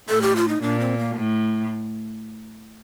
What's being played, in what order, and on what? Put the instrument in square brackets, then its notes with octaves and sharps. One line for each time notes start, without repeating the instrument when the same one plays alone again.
[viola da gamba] A2 [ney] A4
[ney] G4
F4
D#4
[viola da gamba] A#2 [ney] D4
[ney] C4
A#3
[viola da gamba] A2